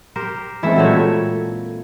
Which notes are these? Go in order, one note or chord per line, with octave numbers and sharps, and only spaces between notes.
G4 A#4 C5
E3 G#3 C4 E4 A4 E5
A#2 C4 F#4 A4 C#5 E5
A3